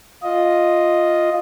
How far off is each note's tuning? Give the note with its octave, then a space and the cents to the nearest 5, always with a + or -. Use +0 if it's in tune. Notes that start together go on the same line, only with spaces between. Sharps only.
F4 +0 D#5 +0